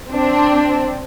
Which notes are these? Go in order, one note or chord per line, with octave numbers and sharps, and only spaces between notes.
C4 D4